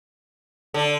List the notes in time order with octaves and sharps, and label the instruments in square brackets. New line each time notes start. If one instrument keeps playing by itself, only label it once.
[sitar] D3